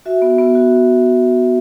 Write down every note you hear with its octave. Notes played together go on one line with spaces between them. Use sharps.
F#4 E5
B3
B3
F#4